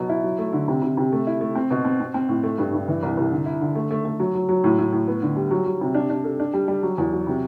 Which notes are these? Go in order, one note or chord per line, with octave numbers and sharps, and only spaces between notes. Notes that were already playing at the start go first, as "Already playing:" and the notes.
Already playing: B2 F#3
E4
F#3
A3
D3
C3
C3
C3
A3
E4
A3
C4
B2
C4
C4
C4
A2
A3
G2
G2
E3
C2
C2
D3
E4
D3
A3
A3
A3
F#3
F#3
F#3
A2
A2
A2
B3
D3
G3
F#3
F#3
C3
D4
D4
A4
D4
G3
G3
F#3
E2
F#3
C3